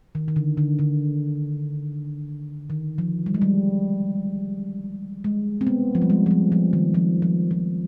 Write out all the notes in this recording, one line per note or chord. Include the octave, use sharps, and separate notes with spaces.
D#3
D#3
D3
D3
D3
D#3
F3
G3
G#3
G3
G#3
C4
B3
F3
G3
G#3
F3
G3
F3
D#3
F3
F3
F3